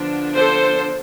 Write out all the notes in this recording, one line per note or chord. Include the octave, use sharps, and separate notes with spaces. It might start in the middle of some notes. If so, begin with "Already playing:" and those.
Already playing: D3 F3 B3 D4
A4 C5